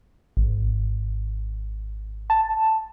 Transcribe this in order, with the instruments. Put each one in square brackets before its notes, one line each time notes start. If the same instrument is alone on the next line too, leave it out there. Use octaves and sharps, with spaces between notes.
[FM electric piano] G#1
A5